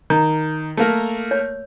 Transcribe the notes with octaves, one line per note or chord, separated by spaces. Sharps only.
D#3 A#5
A3 A#3 A#4
C#5